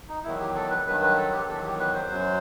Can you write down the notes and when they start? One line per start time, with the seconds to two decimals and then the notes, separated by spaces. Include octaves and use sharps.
0.09 D#4
0.24 E2 D#3 F#3 E4
0.40 G4
0.55 A4
0.70 B4
0.86 G2 D#3 F#3 B4
1.02 B4
1.17 A4
1.32 G4
1.48 E2 D#3 F#3 A4
1.64 G4
1.79 B4
1.94 C5
2.10 F#2 F#3